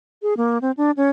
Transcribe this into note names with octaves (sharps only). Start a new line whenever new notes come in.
G#4
A#3
C4
D4
C#4